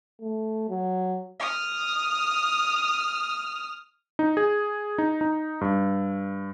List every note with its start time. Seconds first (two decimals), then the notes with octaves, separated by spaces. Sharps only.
0.21 A3
0.69 F#3
1.40 D#6 F6
4.19 D#4
4.37 G#4
4.98 D#4
5.21 D#4
5.61 G2